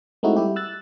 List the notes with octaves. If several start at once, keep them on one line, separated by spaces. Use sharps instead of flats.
G#3 A3 C4 D#4 E4 F#4
G3 E4 G4
E6 F#6 A6